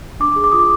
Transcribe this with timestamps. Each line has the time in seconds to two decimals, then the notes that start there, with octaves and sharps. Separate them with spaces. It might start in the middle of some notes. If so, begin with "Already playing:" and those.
0.20 D4 D6
0.36 G#4
0.44 D6
0.52 F4 D#6
0.59 D6